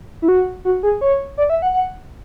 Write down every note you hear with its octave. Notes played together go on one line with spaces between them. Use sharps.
E4
F#4
F#4
G#4
C#5
D5
E5
F#5
F#5